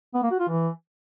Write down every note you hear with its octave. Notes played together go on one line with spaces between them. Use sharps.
B3
A#3
F#4
F4
E3